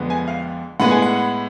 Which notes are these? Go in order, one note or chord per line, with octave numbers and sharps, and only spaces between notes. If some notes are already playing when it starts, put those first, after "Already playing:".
Already playing: F2 D3 F3 G#3 B3
G#5
F5
A2 G#3 B3 F#5
G#5
F#5